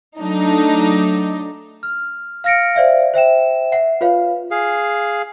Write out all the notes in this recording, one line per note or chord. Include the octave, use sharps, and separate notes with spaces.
F#3 A3 D4 D#4
F6
F5 F6 A#6 C#7 D7
C5 D5 E5 F5
C5 E5 G5 E7
E5 F#5 C7
F4 B4 C#5 F5
G#4 F5